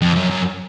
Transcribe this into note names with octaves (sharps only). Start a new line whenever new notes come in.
F2
F#2
F#2